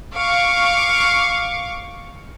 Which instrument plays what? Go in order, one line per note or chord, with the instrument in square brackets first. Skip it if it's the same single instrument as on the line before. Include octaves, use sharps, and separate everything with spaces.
[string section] F5 C#6 D6